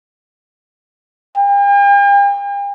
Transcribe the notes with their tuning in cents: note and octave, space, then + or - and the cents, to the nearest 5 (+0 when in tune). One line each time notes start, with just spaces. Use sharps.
G5 +45